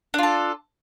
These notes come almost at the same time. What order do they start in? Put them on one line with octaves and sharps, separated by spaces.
D4 F4 A4